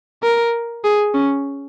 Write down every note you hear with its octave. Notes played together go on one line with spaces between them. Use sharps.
A#4
G#4
C#4